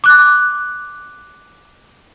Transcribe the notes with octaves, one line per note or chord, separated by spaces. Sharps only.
D6 F#6